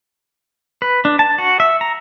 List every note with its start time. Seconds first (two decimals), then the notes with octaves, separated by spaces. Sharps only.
0.82 B4
1.05 D4
1.19 A5
1.38 F#4
1.60 E5
1.81 A#5